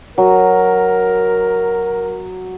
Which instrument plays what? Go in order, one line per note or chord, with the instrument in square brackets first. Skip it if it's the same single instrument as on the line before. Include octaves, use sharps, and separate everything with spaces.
[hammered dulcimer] F#3 [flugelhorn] A#4